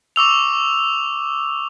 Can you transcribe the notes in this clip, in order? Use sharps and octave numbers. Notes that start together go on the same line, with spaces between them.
C#6 D6 E6 F7